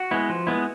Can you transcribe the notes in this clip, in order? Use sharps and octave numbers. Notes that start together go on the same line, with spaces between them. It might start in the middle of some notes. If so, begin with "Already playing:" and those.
Already playing: F#4
G#3 B3 E4
F3
G#3 B3 E4